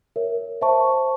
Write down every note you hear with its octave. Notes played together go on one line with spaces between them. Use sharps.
A#4 C#5 E5
C5 E5 A5 C#6